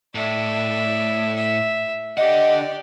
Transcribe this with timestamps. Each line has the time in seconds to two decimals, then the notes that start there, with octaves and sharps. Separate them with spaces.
0.15 A2 D5 E5
1.36 E5
2.17 D3 G4 D5 D#5 F#5